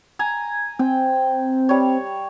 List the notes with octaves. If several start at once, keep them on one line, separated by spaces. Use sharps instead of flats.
G#5 A#5
C4 G5
G3 C#5